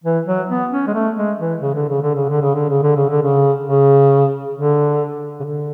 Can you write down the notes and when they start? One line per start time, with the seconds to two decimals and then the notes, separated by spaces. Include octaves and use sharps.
0.04 E3
0.26 F#3
0.49 B3
0.71 C#4
0.87 G#3
0.94 A3
1.16 G#3
1.39 E3
1.61 C#3
1.75 D3
1.88 C#3
2.02 D3
2.15 C#3
2.29 D3
2.42 C#3
2.55 D3
2.69 C#3
2.83 D3
2.96 C#3
3.10 D3
3.23 C#3
3.64 C#3
4.55 D3
5.40 C#3
5.44 D3